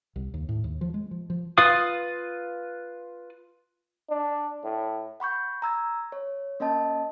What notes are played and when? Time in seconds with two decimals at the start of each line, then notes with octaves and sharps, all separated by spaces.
0.16 C2
0.34 D#2
0.49 A2
0.64 D#2
0.81 F3
0.94 G#3
1.11 F3
1.30 F3
1.58 F4 B4 F5 D#6
4.10 D4
4.64 A2
5.20 F#5 B5 C#6 G6
5.62 A#5 E6 G#6
6.12 C#5
6.60 A#3 C#4 D#5 A5